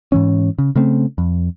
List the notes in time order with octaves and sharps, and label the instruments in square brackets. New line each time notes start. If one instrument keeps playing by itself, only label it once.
[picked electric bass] G#2 E3 C#4
C#3
C#3 A3 C4
F2